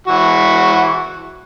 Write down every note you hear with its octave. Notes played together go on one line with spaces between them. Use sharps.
E3 F#4